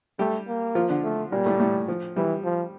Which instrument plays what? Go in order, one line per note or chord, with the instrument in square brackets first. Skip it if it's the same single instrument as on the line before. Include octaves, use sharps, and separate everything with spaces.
[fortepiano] G3 G4 [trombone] A3
[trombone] A#3
[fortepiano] F3 F4
D3 D4
[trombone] A3
[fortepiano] A#2 A#3 [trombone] G3
[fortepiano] A2 A3
A2 A3
F3
[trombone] E3 [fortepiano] G3
[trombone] F3